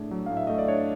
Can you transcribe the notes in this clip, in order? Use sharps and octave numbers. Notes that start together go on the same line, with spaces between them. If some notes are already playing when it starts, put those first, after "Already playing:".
Already playing: A2 A3 D4 G#4
F#3
A2 F5
E5
A3 D#5
D5
D4 C#5